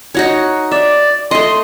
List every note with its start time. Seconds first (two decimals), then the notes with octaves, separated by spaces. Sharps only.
0.15 D#4 F#4 C#5
0.72 D5 E5
1.31 A3 D#5 C6